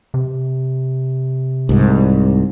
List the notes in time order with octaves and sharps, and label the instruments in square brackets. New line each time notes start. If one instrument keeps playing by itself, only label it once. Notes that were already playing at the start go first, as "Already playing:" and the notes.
[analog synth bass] C3
[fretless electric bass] C2 G#2